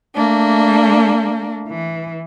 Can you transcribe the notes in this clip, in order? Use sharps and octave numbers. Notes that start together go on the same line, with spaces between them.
A3 A#3 D4
E3